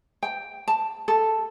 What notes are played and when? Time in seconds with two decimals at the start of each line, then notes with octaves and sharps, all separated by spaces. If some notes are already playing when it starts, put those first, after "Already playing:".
0.23 G5
0.68 A5
1.08 A4